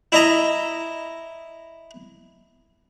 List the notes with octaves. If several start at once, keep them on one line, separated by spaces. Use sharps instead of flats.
E4 D#5 A#5